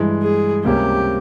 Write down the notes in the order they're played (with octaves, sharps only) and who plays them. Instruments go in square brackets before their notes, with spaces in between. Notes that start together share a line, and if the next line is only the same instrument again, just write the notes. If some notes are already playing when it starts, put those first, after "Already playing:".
Already playing: [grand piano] G2 E3 G#3
[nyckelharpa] G#4
[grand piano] C#2 C3 G3 A#3 C#4 [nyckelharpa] G4